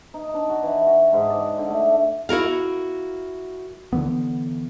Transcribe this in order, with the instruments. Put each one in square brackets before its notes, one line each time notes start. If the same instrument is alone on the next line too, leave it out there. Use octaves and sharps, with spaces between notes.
[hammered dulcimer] D#4
D4
F#4
E3
F#4
G#2
D5
D3
A3
[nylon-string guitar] E4 F#4 A#4 F5
[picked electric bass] D3 E3 B3